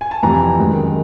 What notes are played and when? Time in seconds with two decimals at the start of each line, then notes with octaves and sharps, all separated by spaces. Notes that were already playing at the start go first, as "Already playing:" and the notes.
0.01 G#5
0.11 A5
0.23 F2 C3 E3 G3 A#5
0.59 F#2 D#3 G#3